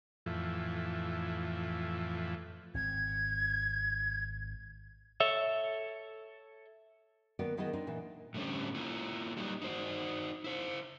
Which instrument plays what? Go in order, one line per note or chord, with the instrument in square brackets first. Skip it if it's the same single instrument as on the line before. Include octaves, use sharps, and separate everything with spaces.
[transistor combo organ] F2 A2 E3
[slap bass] G#1 C4 [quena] G#6
[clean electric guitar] A4 C#5 E5
[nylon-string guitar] D#3 B3 B4 D5
D#3 B3 E4 G#4 B4 D#5
C4 D4 D#4
A#2 E3
[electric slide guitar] A2 D3 G3 C4 C#4
A#3 E4 F4
F#3 G3 D#4 F#4 G4
D#4 F#4 C5
E4 C5